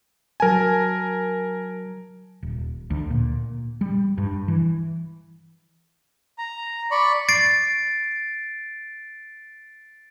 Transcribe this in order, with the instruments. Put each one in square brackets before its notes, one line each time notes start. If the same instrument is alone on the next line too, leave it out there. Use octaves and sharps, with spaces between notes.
[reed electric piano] F#3 A5 [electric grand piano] A#4 G#5
[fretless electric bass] D#1
D2
A#2
G3
G2
E3
[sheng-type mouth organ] A#5
D5 B5 C#6
[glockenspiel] A6 C7 D7